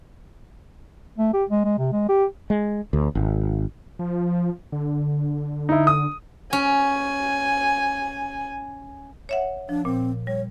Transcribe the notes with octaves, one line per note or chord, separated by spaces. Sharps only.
A3
G4
G#3
G#3
C3
G#3
G4
G#3
D2
G#1
F3
D3
D#4 E4
D#6
C#4 G#5
C#5 E5 F#5
F3 D4
A#2 C4
G3 C#5